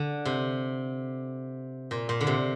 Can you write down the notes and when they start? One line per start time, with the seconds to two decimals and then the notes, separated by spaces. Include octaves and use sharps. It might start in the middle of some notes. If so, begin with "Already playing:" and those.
Already playing: D3
0.25 C3
1.91 A#2
2.09 A#2
2.21 D3
2.27 C3